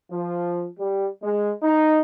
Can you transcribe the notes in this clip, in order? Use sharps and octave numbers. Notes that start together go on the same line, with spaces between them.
F3
G3
G#3
D#4